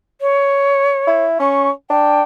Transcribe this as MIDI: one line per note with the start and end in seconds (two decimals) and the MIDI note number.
0.21 1.23 73
1.07 1.37 64
1.39 1.70 61
1.39 1.70 85
1.90 2.22 62
1.90 2.23 79